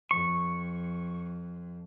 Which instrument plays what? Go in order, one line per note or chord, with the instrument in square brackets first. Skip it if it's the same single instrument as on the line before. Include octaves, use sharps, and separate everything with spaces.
[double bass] F2 [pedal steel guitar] C#6